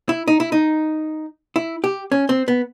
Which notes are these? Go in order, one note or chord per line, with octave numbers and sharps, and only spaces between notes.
E4
D#4
E4
D#4
E4
G4
C#4
C4
B3